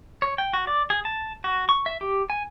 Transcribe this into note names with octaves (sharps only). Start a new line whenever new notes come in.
C#5
G5
F#4
D5
G#4
A5
F#4
C#6
E5
G4
G#5